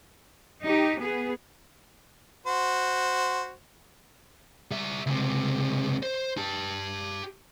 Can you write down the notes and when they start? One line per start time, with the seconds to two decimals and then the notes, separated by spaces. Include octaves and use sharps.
0.63 D#4 G4
1.00 B3 G#4
2.47 F#4 C5
4.71 G3 E5
5.06 C#2 C3
6.03 C5
6.38 G4 A5